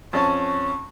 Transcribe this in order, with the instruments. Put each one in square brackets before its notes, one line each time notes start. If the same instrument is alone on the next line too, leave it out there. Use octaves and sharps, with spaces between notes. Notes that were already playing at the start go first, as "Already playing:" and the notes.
[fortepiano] F2 C#4 A5 [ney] C#6